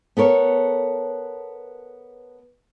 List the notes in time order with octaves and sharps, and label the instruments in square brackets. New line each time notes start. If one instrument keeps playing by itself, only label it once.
[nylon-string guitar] B3 A4 A#4 C#5